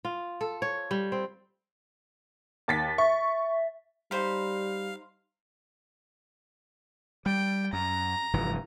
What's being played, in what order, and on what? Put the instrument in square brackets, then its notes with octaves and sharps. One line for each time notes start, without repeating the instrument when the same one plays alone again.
[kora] F4
A4
C#5
G3
C4
[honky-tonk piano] D#2 A6 B6
[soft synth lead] E5 [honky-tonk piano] C#6
[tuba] G3 [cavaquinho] D#4 C5 B5 [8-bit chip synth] F5
[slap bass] G3 [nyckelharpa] G5
[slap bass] F#2 [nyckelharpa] A#5
[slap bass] F1 G2 E3